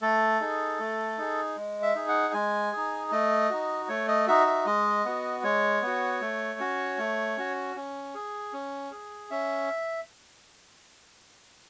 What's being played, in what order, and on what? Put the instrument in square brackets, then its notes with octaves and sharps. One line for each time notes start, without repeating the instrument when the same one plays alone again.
[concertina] A3 A4
D#4 G#4
A3
D#4 G#4
G#3
E5
D#4 G#4
F#5
G#3 G#5
D#4 G#4
A3 D#5
D#4 F#4
A3 C#5
D#5
D#4 F#4 E5
E5
G#3 D#5
B3 F#4
G#3 C#5
B3 F#4
A3
C#4 F#4
A3
C#4 F#4
C#4
G#4
C#4
G#4
C#4 E5